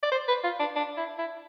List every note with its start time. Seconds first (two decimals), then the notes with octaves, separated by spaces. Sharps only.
0.03 D5
0.12 C5
0.28 B4
0.44 F4
0.60 D4
0.76 D4
0.97 E4
1.18 E4